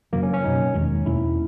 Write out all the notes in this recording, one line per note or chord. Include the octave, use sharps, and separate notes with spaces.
F#2 C#3 F#3 A#3
C#4
C#4
B2 F#3 B3 D#4
E2 D#3 G#3 C#4
E2 B2 A#3 C#4 E4